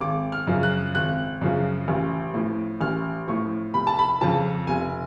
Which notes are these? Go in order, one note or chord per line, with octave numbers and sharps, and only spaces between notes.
G#1 D6
F6
F#2 C#3 F3
F#6
G#1 F#6
F#2 C#3 F3
A1
A2 F3
A1 F6
A2 F3 C#6
F1 B5
A5
B5
F2 C#3 F3 A5
F1 G#5